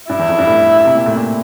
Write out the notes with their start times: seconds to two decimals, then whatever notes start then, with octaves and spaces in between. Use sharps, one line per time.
0.10 G2 E4
0.19 E2
0.29 F2
0.38 G2
0.47 A2
0.85 C3
0.95 A#2
1.06 A2
1.16 A#2